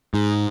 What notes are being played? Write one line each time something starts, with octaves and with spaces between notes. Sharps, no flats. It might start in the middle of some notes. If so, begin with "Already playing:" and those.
G#2